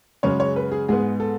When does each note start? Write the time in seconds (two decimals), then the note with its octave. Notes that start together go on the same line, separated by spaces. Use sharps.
0.23 F#2 C#3 G#3 C#4 C#5
0.40 C#5
0.56 B4
0.71 G#4
0.89 G#2 G#3 B3 G#4
1.20 A4